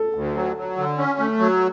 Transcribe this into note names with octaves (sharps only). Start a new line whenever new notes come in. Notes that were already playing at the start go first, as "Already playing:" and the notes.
Already playing: A4
D2
F#3
F#3
D3
C#4
A3
F#3